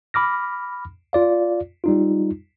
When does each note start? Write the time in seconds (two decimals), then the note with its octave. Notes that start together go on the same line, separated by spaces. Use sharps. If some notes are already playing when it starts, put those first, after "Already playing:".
0.14 B5 D6 F6 A#6
1.13 F4 D5 F5
1.84 G3 D#4 F4